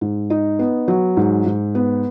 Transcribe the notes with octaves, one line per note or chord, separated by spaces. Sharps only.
G#2
D#4
B3
F#3
G#2
G#2
B3